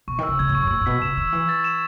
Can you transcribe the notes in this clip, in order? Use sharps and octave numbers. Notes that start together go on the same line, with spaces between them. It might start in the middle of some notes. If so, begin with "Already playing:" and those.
B2 C#6
D#3
E6
C#3
C#3 G#6
A2
C#6
F#2
B2
A2 E6
A2
B2 B6
C#3 E7
D#3 E6
E3 E6
A6
E7